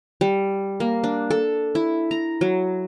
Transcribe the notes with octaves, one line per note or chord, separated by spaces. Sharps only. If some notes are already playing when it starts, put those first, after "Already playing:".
G3
A#3
D4
A4
E4
A#5
F#3